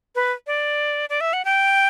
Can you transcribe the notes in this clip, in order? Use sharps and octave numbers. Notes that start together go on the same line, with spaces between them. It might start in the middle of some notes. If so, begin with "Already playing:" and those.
B4
D5
D5
E5
F#5
G5